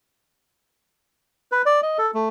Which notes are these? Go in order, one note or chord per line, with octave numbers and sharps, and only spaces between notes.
B4
D5
D#5
A4
A3